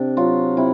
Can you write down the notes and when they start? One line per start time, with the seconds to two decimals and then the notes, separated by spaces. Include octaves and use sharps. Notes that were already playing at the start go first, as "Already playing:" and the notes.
Already playing: C3 D4
0.17 F#3 F4
0.57 C3 E4